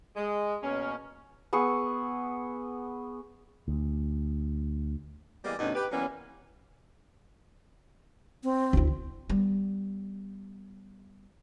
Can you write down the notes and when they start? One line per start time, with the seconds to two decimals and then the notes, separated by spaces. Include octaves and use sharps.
0.16 G#3
0.62 B2 A#3 C#4
1.53 B3 G#4 C#6 E6
3.68 D2
5.44 E3 G3 G#3 A#3 B3 D#5
5.58 D2 G2 B2 B3 C#4 D#4
5.75 G4 B4
5.91 E3 F#3 G3 A#3 B3 C#4
8.44 C4
8.73 D2 E4
9.30 G3 B3